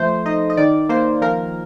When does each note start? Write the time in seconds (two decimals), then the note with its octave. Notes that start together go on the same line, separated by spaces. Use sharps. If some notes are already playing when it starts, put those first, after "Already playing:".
Already playing: F3 A3 C5
0.25 D#4 D#5
0.50 D#5
0.57 D#3 D5
0.89 A#3 C5
1.21 F3 A#4